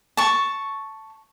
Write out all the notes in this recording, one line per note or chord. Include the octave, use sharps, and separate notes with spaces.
A5 C#6